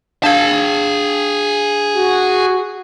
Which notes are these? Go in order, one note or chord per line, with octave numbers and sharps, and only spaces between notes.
D4 G#4 F5 A5 G#6
F#4